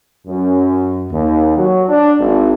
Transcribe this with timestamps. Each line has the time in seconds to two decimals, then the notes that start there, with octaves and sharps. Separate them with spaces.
0.27 F#2
1.11 D#2
1.57 F#3
1.89 D4
2.19 G#1